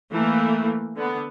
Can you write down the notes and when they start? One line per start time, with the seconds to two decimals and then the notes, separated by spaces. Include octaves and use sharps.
0.11 E3 A3 A#3
0.96 D3 B3